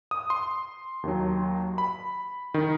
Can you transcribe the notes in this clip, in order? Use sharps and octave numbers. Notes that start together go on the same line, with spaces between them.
D#6
C6
D#2 D#3 F#3
B5
D#3